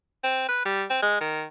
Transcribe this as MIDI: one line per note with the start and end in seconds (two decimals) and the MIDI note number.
0.24 0.44 60
0.49 0.63 71
0.65 0.85 55
0.90 0.99 60
1.02 1.19 56
1.21 1.44 51